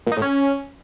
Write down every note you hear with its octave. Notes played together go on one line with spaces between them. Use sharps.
A#2
D#4
A2
C#4